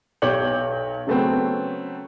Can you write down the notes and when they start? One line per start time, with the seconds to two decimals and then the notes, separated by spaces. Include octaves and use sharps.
0.22 B1 G4 C#5 D6 G6 F#7
1.07 C#3 F#3 A3 B3 C4